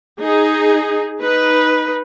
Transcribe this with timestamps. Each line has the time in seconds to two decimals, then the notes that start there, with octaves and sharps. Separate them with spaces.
0.21 D#4 G#4
1.20 D#4 B4